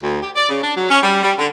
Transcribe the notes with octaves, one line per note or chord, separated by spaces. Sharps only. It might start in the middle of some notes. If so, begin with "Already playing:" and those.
D2
G4
D5
C#3
D4
F#3
C#4
G3
G3
D3